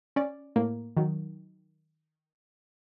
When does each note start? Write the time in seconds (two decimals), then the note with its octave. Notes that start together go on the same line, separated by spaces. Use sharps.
0.16 C#4 D5
0.56 A2 A#3
0.97 D#3 F#3